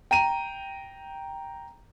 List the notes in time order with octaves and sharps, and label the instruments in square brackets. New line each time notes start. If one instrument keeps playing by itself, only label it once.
[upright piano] G5 A#5 D#7